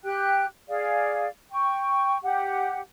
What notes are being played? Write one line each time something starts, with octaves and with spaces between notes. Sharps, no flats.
G4 G5 F#6
G#4 D5 F5
G5 C#6
G4 F#5